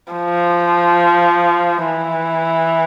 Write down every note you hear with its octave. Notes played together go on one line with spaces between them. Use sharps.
F3
E3